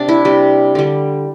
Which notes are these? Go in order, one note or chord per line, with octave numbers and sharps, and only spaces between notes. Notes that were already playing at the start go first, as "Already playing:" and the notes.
Already playing: C3 D4
E4
C3 G3
D3 G3